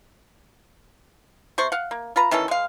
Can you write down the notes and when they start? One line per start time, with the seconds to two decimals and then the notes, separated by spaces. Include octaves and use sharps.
1.58 C3 C5 C#6
1.72 F5 F#5
1.91 A#3
2.16 F4 B4 A#5
2.31 D#3 E3 C#4 A4
2.48 G#3 F5